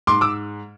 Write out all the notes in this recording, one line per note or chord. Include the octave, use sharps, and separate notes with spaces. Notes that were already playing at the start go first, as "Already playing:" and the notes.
G#2 C6 D6
D6 E6